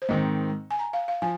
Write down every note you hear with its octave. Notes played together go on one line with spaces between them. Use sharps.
C5
G#2 D#3 C4 D#5
G#5
A#5
F5
F5
F3 G#5